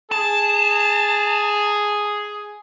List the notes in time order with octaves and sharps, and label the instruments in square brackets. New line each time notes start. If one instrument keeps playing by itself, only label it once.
[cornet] G#4 [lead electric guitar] A5